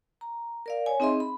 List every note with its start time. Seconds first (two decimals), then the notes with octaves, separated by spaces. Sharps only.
0.21 A#5
0.66 A#4 D5 F5
0.86 C#5 G#5
1.00 C4 D#4 G#4 D#5 E5 C6
1.20 B5